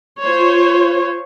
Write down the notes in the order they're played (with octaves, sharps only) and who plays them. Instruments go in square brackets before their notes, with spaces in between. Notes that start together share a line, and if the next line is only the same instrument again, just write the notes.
[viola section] F4 C5 C#5